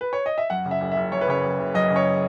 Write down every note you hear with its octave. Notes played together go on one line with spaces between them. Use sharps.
B4
C#5
D#5
E5
F#2 F#5
C#3
E5
F#1
E5
F#1
F#2 C#5
B4
C#3 C#5
F#1
F#1
F#2 D#5
C#3
C#5